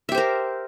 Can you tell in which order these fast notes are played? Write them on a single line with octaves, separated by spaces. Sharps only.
E5 G4 C5 A#4